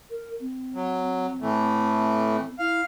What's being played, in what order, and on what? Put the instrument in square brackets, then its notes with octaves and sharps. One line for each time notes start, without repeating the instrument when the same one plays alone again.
[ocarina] A#4
C4
[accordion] F#3
A2 E3 A3
[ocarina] E4 [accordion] F5